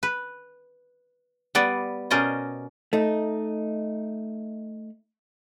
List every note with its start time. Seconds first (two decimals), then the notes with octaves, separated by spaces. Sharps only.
0.03 B4
1.55 G3 B3 D5
2.10 B2 C#4 A#4 C5 D5 D#5
2.93 A3 D#4